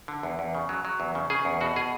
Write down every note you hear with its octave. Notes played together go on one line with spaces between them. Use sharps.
D3
E2
E2
C#3
F#3
F#3
E2
C#3
C#3 G#4
E2
B2 F#4
B2 G#4